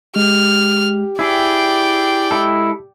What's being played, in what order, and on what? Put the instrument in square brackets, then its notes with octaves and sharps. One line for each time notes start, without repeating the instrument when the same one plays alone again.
[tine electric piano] G#3 [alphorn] G4 [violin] F6
[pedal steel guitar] E4 G#4 [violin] D5 G5 [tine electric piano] E6
[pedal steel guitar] G#3 E4 A4